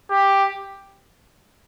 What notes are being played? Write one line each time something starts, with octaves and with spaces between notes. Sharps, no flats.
G4